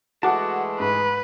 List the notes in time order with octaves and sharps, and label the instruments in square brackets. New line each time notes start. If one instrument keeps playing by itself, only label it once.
[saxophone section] E3 G#3 A3 [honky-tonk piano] F#4 F#5 [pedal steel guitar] A5 D6
[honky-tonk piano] G#2 [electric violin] B4